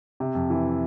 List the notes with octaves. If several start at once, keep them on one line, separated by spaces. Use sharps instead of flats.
C3
F2
E3